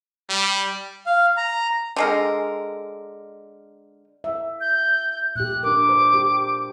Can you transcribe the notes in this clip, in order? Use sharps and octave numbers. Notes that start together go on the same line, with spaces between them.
G3
F5
A#5
D3 G#3 A#4
E5
G6
A#2 G4 F#6
D4 A#4 D6
C5
G4